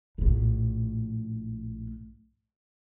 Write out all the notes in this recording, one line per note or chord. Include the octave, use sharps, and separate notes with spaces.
A#1 A2